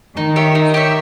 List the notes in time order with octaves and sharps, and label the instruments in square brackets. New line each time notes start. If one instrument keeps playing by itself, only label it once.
[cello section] D#3 [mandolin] D#4
[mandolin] G4 C#5 E5
D#4
G4 C#5 E5